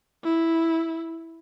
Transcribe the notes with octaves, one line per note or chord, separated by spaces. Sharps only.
E4